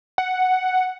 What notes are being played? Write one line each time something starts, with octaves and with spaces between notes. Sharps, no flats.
F#5